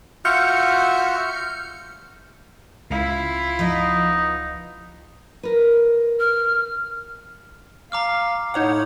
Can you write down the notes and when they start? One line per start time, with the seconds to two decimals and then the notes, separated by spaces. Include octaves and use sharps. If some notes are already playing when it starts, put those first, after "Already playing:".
0.25 F4 F#4 E5 F6 G6 C#7
2.90 C#2 E4 F4 F5
3.59 F3 B3 D#4 D#5
5.43 A#4 B4
6.20 F6
7.92 F5 A#5 D6 F6
8.54 A2 D#4 C#5 F#5